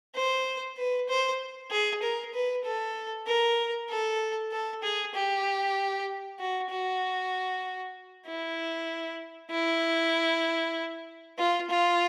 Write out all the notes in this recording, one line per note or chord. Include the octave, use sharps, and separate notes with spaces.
C5
B4
C5
G#4
A#4
B4
A4
A#4
A4
A4
G#4
G4
F#4
F#4
E4
E4
F4
F4